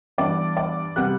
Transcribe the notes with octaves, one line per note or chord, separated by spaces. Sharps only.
G2 E3 B3 D4 D5 D6
D5 D6
C3 G3 B3 F#5 F#6